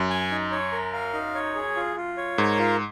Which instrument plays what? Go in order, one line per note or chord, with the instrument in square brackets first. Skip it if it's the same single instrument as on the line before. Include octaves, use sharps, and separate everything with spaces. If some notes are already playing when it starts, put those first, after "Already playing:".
Already playing: [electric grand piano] F#2
[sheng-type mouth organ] G#5
D#4
C#5
A#4
F5
D#4
C#5
G#4
F4
F4
C#5
[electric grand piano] G#2 [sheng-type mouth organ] A#4
[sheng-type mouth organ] F4